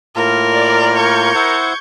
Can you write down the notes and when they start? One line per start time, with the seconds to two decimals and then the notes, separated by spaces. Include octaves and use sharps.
0.16 A2 A#3 F4 A#4
0.54 D5
0.95 C#6 G6 G#6
1.35 E4 C5 F#5